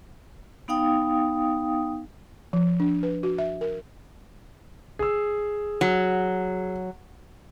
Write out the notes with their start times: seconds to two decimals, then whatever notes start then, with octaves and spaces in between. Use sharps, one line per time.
0.68 B3 D#4 F5 G5 D#6
2.53 F3
2.80 D4
3.03 B4
3.23 F#4
3.38 E5
3.61 A#4
4.99 G#4 E6
5.81 F#3